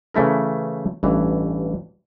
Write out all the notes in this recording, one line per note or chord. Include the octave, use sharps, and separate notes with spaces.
C#3 E3 A3 E4 A#4
A1 G2 E3